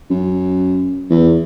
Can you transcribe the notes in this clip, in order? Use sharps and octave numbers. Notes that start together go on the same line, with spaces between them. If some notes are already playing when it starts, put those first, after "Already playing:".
F#2
E2